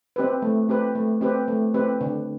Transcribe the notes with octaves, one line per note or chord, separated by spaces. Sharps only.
C4 G4 B4
A3
C4 G4 B4
A3
C4 G4 B4
A3
C4 G4 B4
D3